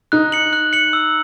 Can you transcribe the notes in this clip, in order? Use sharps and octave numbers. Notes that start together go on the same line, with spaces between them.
D#4 F#6
C#7 F#7
F#6
C#7 F#7
E6